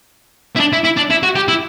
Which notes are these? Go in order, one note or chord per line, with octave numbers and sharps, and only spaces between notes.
E4
D4
E4
E4
D4
E4
F#4
G4
E4